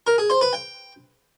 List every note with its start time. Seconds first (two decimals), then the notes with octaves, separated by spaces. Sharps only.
0.07 A#4
0.18 G#4
0.30 C5
0.41 B4
0.53 G5